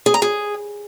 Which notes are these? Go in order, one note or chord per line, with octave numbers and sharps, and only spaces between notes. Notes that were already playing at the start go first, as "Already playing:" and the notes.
G#4
A#5
G#4